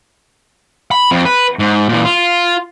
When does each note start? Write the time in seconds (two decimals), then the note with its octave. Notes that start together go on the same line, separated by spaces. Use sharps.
0.91 B5
1.11 F2 C4
1.25 B4
1.59 G#2
1.89 A#2 E3
2.05 F4